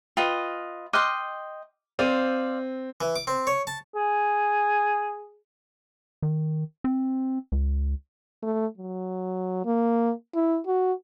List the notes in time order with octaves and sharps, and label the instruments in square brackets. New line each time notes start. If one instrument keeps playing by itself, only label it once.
[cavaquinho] F4 B4 D#5 [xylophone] G5
[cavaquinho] D#5 G5 C6 [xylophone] D6 F6 F#6
[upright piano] C4 D#7 [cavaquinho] C5 D5 F5
[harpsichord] E3
D6
C4
C#5
A5
[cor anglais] G#4
[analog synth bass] D#3
C4
C#2
[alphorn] A3
F#3
A#3
E4
F#4